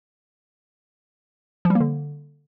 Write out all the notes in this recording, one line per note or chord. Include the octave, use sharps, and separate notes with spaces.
F3
G3
A#3
D3